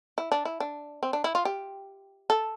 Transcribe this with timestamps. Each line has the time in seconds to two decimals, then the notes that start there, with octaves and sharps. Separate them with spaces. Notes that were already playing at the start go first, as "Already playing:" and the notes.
0.18 E4
0.32 D4
0.45 E4
0.60 D4
1.03 C4
1.13 D4
1.24 E4
1.35 F4
1.45 G4
2.30 A4